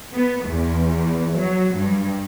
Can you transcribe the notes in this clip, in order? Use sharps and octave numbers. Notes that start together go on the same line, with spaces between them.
B3
E2
F#3
G2